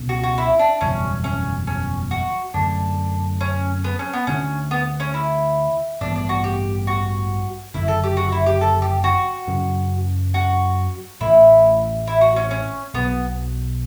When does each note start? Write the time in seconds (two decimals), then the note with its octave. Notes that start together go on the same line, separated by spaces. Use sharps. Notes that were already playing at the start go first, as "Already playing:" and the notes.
Already playing: C#2 B2 C#4
0.09 F#4
0.23 F#4
0.38 E4
0.59 D4
0.81 F#1 E2 B2 G3 C#4
1.24 C#4
1.67 C#4
2.11 F#4
2.54 F#2 D3 A3 D4
3.41 C#4
3.84 B3
3.99 C#4
4.13 B3
4.27 D2 D3 A3 C#4 D4
4.71 B3
5.00 C#4
5.14 E4
6.01 A1 G2 E3 B3 D4
6.16 D4
6.29 F#4
6.44 G4
6.87 F#4
7.74 F#1 F#2 D3 E4
7.88 A4
8.04 G4
8.17 F#4
8.32 E4
8.46 G4
8.61 A4
8.82 G4
9.04 F#4
9.47 F#2 C#3 F#3 C#4
10.34 F#4
11.21 A1 A2 E3 A3 E4
12.07 E4
12.21 F#4
12.36 C#4
12.51 C#4
12.94 B1 B2 F#3 B3